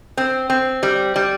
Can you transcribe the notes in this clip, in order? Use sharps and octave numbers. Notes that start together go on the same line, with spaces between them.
C4
C4
G3
G3